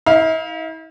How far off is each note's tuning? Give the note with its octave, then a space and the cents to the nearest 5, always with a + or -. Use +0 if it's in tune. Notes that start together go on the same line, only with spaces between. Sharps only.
E4 -45 F5 +0